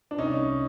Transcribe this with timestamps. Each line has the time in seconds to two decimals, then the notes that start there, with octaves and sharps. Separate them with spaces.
0.11 D4
0.18 C2 C#4 D#4